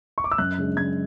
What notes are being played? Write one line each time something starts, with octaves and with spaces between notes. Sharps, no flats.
C#6
D6
E6
F#2 F#6
C#3 G#3 D4
F#2 G#6